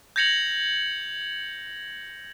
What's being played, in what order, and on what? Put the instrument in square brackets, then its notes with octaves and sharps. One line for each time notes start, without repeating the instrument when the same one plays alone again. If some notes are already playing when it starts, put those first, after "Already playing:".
[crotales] G6 G#6 A#6 C#7 F7 F#7